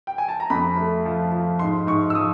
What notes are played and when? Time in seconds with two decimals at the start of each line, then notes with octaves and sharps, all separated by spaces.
0.07 G5
0.18 G#5
0.29 A5
0.40 A#5
0.50 F2 B5
0.77 A3
1.05 F3
1.32 F3
1.59 G#2 C6
1.87 G#2 C#6
2.10 E6
2.15 F3 D#6